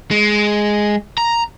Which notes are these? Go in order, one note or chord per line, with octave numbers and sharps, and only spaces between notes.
G#3
A#5